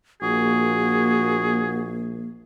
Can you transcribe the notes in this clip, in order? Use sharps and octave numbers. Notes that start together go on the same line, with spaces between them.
A#1 A#3 F#4 G#4